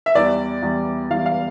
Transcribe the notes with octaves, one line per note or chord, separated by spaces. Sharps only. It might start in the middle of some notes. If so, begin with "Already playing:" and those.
E5
E2 E3 G3 D5
E2 E3 G3
E2 E3 G3 F5
F5